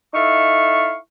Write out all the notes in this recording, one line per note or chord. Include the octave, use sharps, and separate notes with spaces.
D#4 E4 A4 E5 F5 C#6